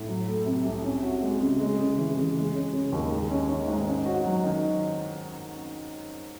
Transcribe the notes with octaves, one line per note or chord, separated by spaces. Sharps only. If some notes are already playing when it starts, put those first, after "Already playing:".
Already playing: A2
F#3
A3
C3
C2
C#4
F#4
G#3
C#3
G#3
C#3
E3
C#3
G#3
C#4
C#3
D#2
G#3
C#4
D#3
G#2
C#4
F#4
F#3
D#3